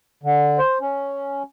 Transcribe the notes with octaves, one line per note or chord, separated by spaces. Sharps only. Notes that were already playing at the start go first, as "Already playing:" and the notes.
D3
C5
C#4